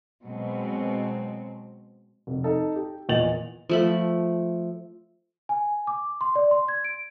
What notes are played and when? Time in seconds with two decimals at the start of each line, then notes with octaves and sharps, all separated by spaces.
0.23 B2 F#3 G#3 C4
2.27 F1
2.44 D#4 A4
2.76 G4
3.09 E2 A#2 D#5 A6 F7 F#7
3.69 F3 A3 B5
5.49 G#5
5.87 D6
6.21 C6
6.36 D5
6.51 C6
6.68 G#6
6.84 D7